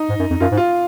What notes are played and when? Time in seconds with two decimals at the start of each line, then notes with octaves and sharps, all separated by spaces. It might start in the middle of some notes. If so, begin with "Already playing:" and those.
Already playing: D#4
0.09 G#2
0.19 F#2
0.30 F2
0.40 F#2 F4
0.52 G#2
0.57 F4